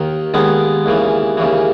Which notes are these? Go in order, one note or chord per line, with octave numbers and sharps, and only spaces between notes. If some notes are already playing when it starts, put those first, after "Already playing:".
Already playing: D#2 D#3
D#2 D#3 G#3 B3
D#2 C#3 E3
D#2 C#3 E3